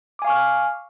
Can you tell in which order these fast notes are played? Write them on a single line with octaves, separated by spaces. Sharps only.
D6 G#5 F5 C#6 F6